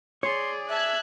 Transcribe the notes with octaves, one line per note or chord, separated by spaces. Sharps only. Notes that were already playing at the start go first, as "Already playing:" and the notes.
G#4 C#5 D5 C6
E5 A5 F#6 G#6